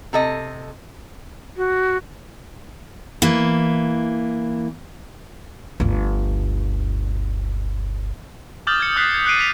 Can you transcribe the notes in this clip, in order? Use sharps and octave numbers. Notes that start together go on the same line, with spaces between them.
C3 A4 D#5
F#4
E3 A#3
G1 D2
D6 D#6 F6 G6 A6 F#7
G#6 C#7
D#6 F#6 G6 B6 C7
G#6
F#6 G6 C7 D7 D#7
B6 F7